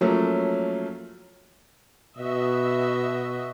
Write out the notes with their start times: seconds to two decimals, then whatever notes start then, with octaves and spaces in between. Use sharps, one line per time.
0.01 F3 F#3 A3 A#3 C#4
2.18 B2 F#4 D#5 E5